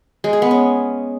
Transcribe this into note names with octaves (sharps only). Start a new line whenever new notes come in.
G#3
G#4
B3
C#4